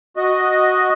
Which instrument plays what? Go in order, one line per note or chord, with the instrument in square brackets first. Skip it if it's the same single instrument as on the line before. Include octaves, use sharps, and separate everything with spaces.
[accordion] F#4 D#5